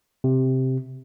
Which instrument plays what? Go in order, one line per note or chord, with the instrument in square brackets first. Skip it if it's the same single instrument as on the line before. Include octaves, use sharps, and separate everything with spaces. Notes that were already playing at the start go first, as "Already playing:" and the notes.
[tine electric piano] C3